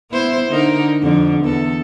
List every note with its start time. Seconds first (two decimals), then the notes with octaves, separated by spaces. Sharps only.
0.11 B3 E4 C5
0.48 D3 D#4 A#4
1.02 F2 D3
1.42 E2 A4